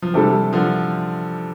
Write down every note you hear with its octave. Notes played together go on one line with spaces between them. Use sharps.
F3
C3 E3 G3 D4 A4 C5
D3 F3